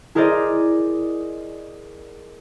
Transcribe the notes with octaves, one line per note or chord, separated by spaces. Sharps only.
E4 G#4 A#4 C5 D5 D#5